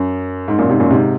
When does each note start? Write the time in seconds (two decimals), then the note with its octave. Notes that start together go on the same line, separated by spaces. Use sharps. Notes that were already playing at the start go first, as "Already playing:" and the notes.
Already playing: F#2
0.48 G#2
0.58 F#2 A#2
0.69 G#2 C3
0.80 F#2 A#2
0.90 G#2 C3